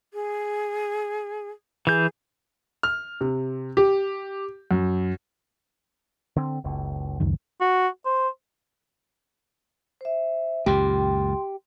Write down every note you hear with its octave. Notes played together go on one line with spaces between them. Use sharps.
G#4
E3 G#4 G6
F6
C3
G4
F#2
D3 C4
F#1 C#2
C#2 F#2 D#3
F#4
C5
C5 E5
C#2 F#2 A#2 G4 G5 C6